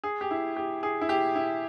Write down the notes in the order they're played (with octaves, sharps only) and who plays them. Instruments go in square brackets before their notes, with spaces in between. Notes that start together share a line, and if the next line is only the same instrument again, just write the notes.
[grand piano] G#4
G4
E4
G4
G#4
E4
G4
E4